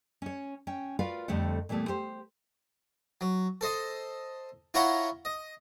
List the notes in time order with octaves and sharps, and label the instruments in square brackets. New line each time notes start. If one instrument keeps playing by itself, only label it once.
[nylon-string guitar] C#4 C#5
C#4 G5
F4 F#4 A#4 B4 D5 F5
F2 D3 G3 A3 C4 F#5
A#2 E3 G3 A3 B3
G4 C5
[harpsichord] F#3
A4 C5 D#5
E4 F4 C#5 F#5 A#5 C6
D#5